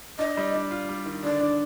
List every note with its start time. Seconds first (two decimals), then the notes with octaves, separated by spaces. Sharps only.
0.19 D4 D#5
0.37 G3
0.55 D4
0.71 F4
0.89 G3
1.06 D#3
1.24 D3 D5
1.40 D4